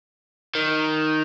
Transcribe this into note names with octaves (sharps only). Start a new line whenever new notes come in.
D#3